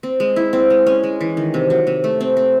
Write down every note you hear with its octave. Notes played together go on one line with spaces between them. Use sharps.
C4
G#3
E4
C4
G#3
C#4
G#3
E3
D#3
C3
F#3
C3
A3
C4
C4